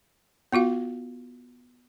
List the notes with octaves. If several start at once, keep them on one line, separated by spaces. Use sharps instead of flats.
B3 F4 F#4 F5